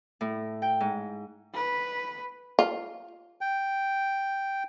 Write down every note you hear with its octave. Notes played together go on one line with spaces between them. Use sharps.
A2
G5
G#2
B4
F4
G5